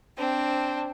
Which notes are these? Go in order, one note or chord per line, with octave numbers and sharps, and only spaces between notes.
C4 D4